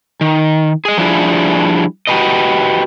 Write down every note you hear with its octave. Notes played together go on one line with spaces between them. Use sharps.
D#3
G#4 D#5
F3 G3 D4 E4 F4 G#4
F#4 G4 A4 B4 D#5